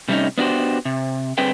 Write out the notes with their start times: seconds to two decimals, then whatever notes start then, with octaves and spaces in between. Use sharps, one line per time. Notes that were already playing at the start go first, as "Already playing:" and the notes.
0.08 C3 G3 A3 B3 C#4 D#4
0.38 B3 D4 F#4 G4 C5
0.85 C3
1.38 G2 D3 C4 G#4 B4 G5